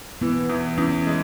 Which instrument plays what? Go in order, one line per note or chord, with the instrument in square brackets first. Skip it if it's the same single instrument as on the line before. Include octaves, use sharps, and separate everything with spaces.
[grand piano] E3 [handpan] B3
[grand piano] E2
[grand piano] E2 [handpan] C#4
[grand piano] G#3